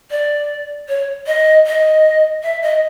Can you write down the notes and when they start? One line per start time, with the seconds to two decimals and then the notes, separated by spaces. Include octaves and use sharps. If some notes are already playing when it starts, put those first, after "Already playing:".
0.11 D5
0.89 C#5
1.27 D#5
1.67 D#5
2.43 E5
2.62 D#5